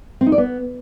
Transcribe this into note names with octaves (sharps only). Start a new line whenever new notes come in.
C4
D#4
D5
B3